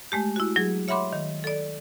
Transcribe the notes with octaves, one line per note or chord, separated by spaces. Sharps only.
G#3 A3 G4
E4 F#4
F#3 G#4
C#5 E5 F#5 B5 C6 D6
D#3
A4 D5